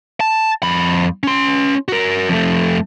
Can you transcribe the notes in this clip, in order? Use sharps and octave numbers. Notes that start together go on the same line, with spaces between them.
A5
F2 B5
C#4 C6
F#4 A#4
F2 A3